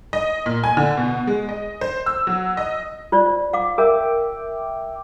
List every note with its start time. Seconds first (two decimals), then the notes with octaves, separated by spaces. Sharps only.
0.13 D#5
0.46 A#2
0.64 G#5
0.77 D3
0.97 B2
1.27 G#3
1.49 D#5
1.81 C5
2.06 E6
2.27 F#3
2.57 D#5
3.12 F4 C5 D5
3.53 F5 D6
3.78 A#4 E5 G5 D6